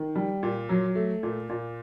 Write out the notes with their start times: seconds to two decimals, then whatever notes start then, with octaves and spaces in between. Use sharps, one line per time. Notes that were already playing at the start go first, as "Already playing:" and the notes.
Already playing: D#3
0.16 G3
0.43 A#2
0.69 F#3
0.95 A3
1.23 A#2
1.49 A#2